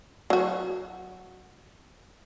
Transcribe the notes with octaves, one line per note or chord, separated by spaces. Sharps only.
F#3 F#4